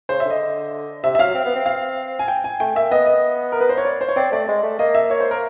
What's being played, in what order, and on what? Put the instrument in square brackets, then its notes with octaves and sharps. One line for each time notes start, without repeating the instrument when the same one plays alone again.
[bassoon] C#3 [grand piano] C5
[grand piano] E5
[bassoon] D3 [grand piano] D#5
[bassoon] C3 [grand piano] E5
[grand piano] E5
[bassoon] F#3 [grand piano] F5
[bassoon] C4
B3
C4
[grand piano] F5
G#5
G5
G#5
[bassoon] A3 [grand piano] G5
[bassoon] A#3 [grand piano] E5
[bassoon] B3 [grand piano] D#5
[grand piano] D#5
A#4
B4
C5
C#5
D5
C5
C#5
[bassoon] C4 [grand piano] D5
[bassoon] A3 [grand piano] D5
[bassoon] G#3
A3
[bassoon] A#3 [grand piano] D#5
[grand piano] E5
C#5
C5
A#4